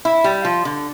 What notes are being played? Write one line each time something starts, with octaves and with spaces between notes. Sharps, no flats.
E4
G3
F3
D3